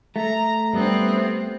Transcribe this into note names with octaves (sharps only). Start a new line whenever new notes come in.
A3 A#5
G3 B3 C4 D4